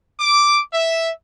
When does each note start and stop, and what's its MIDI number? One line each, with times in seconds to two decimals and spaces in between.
0.19 0.60 86
0.73 1.11 76